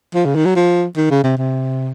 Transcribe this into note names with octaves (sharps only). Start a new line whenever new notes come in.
F3
C#3
D#3
F#3
F3
D#3
C#3
C3
C3